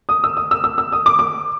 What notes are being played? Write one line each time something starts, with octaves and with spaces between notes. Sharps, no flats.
D#6
E6
D#6
E6
E6
E6
D#6
D6
D6